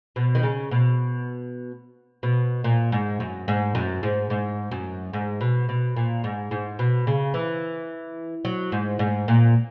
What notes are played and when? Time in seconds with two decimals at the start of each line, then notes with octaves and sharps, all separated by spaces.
0.16 B2
0.35 D#3
0.43 C#3
0.71 B2
2.23 B2
2.64 A#2
2.92 G#2
3.20 F#2
3.48 G#2
3.75 F#2
4.03 G#2
4.30 G#2
4.72 F#2
5.13 G#2
5.41 B2
5.69 B2
5.96 A#2
6.24 G#2
6.51 G#2
6.79 B2
7.07 C#3
7.34 E3
8.45 F#3
8.72 G#2
8.99 G#2
9.28 A#2